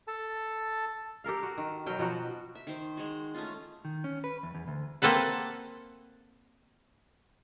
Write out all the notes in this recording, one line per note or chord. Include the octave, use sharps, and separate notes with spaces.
A4 A5
G4 A4 A#4 F5
F#4
D#3
B2 F#3 A#4 G5
B2 F3 B3 F#4
E5
D#3 C5
G#3 F#4
A3 C#4 D#4 F4
D#3
C#4
B4
E2
E2
D2
A#3 C4 A4 B4 F#5